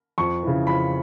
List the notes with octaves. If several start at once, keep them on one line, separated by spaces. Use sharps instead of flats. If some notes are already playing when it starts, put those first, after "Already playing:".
F2 C#6
C#3 E3
F2 B5